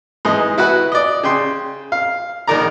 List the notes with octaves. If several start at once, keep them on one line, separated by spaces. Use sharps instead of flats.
G#2 E3 D#5
E4 F#4 B4 F#5
D5 D#5
C#3 G5 C6
F5
A#1 D#3 D#4 A#4 D5 A#5